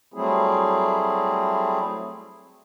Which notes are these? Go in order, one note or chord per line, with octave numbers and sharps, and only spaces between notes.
F#3 G3 A3 C4 E4 G#4